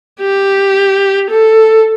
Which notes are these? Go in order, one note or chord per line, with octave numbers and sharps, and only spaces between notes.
G4
A4